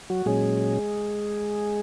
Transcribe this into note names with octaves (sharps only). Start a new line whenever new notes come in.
F#3 F#4
A#2 F#3 G#3 C#4 G#4